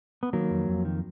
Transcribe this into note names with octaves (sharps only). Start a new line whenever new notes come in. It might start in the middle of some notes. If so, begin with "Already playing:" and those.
B3
D#3 F#3 A#3
F2
F2
D#3